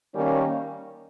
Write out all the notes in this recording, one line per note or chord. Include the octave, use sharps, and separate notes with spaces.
D#3 G3 A#3 C#4